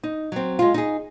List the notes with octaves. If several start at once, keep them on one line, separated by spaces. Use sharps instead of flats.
D#4
F#3 C4
G#3 F4
D#4 G#4